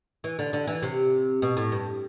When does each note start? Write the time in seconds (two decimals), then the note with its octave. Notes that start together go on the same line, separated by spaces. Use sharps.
0.24 E3
0.39 D3
0.53 D3
0.67 E3
0.83 C3
1.42 B2
1.57 A2
1.72 G2